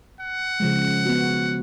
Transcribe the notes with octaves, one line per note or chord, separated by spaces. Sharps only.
F#5
C#3 F3 G#3
B3 F#4